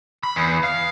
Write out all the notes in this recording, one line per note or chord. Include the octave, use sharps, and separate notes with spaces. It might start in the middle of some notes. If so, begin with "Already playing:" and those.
B5
E2
F5